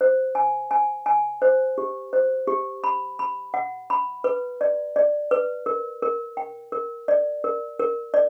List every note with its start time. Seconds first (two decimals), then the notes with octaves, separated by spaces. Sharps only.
0.01 C5
0.35 G#5
0.71 G#5
1.06 G#5
1.42 C5
1.78 G4
2.13 C5
2.48 G4
2.84 B5
3.19 B5
3.54 F#5
3.90 B5
4.24 B4
4.61 D5
4.96 D5
5.31 B4
5.66 A#4
6.02 A#4
6.37 G5
6.72 A#4
7.08 D5
7.44 A#4
7.79 A#4
8.14 D5